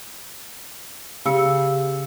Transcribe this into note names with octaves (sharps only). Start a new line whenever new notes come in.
C#3 G4 E6 C#7